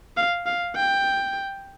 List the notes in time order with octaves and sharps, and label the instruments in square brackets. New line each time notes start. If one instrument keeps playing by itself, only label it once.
[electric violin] F5
F5
G5